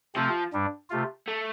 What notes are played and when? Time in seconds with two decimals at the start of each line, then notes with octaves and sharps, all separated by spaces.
0.15 C3 F3 A3 C4 F4
0.53 G2 G3 D4
0.90 C3 A3 F4
1.28 A3